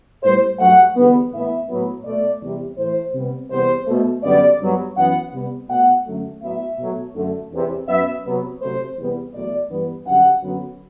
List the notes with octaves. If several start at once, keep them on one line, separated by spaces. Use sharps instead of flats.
A2 G3 B3 C5
G2 F#3 A3 F#5
E2 D3 G3 B3
A2 E3 B3 E5
A2 F#3 B3
B2 A3 D5
E2 C3 G3
A2 E3 A3 C5
C3 G3 B3
E2 C3 G3 B3 C5
B2 A3
F#2 D3 G3 B3 D5
G2 F#3 B3
F#2 E3 B3 F#5
C3 G3 B3
B2 A3 F#5
F#2 D3 F#3 A3
A2 F#3 B3 E5
B2 F#3 A3
F#2 D3 A3
E2 C3 E3
F#2 F#3 B3 E5
C3 F#3 B3
C3 F#3 A3 C5
E2 C3 G3 B3
E2 B2 F#3 A3 D5
G2 E3 G3 B3
F#2 D3 G3 F#5
F#2 D3 F#3 B3